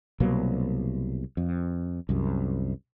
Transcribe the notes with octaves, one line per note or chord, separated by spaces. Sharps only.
C2 B2 F#3 A#3
F2
C2 F#2